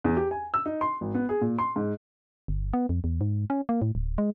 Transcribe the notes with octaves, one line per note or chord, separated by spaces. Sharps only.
E2
G4
G#5
E6
D#4
C6
G#1
B3
G#4
A#2
C6
G#2
G1
B3
F2
E2
G#2
C#4
A#3
A2
D1
G#3